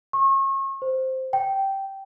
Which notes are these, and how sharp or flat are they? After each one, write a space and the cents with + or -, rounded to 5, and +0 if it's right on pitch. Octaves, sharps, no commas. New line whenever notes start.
C#6 -35
C5 +0
G5 -10